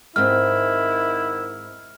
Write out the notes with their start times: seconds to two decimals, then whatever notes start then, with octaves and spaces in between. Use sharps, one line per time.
0.16 G#2 D#3 C4 E4 F6